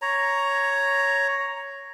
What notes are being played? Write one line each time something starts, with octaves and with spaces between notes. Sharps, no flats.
C#5 A#5